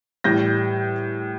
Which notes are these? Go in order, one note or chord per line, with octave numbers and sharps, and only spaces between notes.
A2 E3 G3 G6 A#6